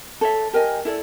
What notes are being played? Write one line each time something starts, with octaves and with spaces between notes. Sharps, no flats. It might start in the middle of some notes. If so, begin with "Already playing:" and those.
A4 C#5 E5
G4 A#4 D#5 G#5
E4 A4 D5